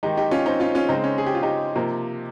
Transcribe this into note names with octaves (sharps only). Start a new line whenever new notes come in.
D#3 G#3 D#4 G4
D#4 G4
C#4 F4
C4 D#4
C#4 F4
C#4 F4
C#3 G#3 C4 D#4
C#4
G#4
G4
F4
D#4 G4
C3 F3 A#3